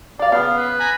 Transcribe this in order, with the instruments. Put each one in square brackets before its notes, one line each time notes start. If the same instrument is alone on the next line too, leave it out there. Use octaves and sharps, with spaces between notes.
[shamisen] D4 F5 [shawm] D5
[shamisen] C#3 [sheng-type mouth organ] B3 [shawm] F5
[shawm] B4
[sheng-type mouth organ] G#5 A#5 B5